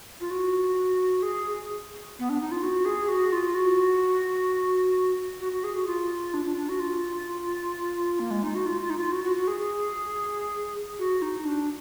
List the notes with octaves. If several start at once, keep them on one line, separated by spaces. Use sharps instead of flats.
F4
F#4
G#4
B3
D4
D#4
F4
F#4
G#4
F#4
F4
F#4
F#4
F#4
G#4
F#4
F4
D4
D4
D4
F#4
F4
A#3
G#3
D#4
F#4
F4
F4
D#4
F4
F#4
F#4
F#4
G#4
G#4
F#4
D#4
D4